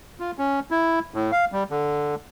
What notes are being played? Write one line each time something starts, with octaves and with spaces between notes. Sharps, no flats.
F4
C#4
E4
A2
F5
G3
D3